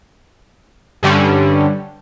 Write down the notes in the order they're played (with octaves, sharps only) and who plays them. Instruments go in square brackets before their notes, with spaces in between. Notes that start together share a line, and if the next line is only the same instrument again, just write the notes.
[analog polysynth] G2 D3 G3 C#4